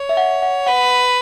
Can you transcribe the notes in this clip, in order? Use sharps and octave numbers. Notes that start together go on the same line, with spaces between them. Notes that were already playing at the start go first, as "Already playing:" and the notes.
Already playing: C#5
E5
F#5
F#5
B4 F#5